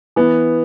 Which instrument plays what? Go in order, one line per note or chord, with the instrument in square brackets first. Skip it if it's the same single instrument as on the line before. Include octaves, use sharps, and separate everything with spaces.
[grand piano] E3 B3